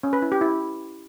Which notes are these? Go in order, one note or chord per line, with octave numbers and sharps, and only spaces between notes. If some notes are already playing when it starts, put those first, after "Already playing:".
C#4
B4
E4
G4
E4